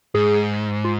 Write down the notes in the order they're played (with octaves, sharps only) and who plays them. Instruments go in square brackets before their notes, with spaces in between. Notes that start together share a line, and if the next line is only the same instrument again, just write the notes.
[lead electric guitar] G#2 [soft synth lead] G#4
[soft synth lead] F4